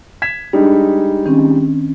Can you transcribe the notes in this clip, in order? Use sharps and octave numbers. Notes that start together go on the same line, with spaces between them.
G#6 B6 E7
G3 G#3 D4 D#4
D#3 C4 C#4